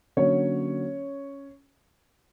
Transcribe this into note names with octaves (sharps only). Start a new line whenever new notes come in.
D3 F#3 A#3 C#4 C#5